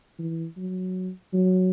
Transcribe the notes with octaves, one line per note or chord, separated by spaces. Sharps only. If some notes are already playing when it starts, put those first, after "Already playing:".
E3
F#3
F#3